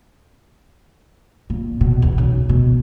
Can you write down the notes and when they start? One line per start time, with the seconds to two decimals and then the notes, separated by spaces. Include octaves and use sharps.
1.50 A#2
1.81 B2
2.02 E2
2.18 B1
2.49 B2